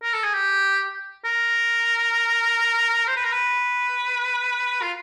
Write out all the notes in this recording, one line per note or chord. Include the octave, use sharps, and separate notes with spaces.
A#4
A4
G#4
G4
A#4
C5
B4
A#4
B4
F4